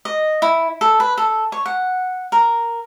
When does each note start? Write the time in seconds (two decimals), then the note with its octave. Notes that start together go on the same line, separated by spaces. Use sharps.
0.05 D#5
0.42 E4
0.81 A4
1.00 B4
1.18 A4
1.52 C#5
1.66 F#5
2.32 A#4